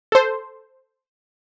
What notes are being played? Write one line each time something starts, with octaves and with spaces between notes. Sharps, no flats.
A4 C5